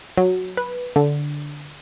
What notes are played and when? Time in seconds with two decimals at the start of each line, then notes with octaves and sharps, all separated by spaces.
0.18 F#3
0.57 B4
0.96 D3